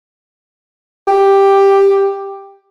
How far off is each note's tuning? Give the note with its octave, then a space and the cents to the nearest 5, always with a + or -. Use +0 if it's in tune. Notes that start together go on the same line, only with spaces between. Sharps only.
G4 +5